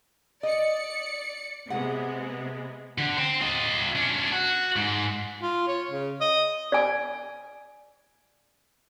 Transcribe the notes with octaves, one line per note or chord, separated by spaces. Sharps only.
D5 D#5 C#7
C3 G#3 B3 F#5
D3
C5 G5
F4 D#5
C#4 D4
F#4
G#2
F4
C#5
C#3
D#5
D5 G#5